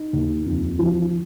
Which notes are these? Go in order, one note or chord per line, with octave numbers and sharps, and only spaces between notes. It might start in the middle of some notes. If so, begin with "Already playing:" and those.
Already playing: D#4
D#2
F2
F3